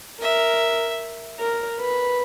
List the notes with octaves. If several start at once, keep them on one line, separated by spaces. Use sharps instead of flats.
A#4 E5
A#4
B4